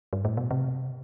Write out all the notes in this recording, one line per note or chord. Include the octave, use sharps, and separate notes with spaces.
G2
A2
B2
C3